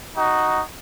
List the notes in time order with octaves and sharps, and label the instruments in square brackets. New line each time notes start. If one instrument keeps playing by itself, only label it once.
[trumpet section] D#4 F#4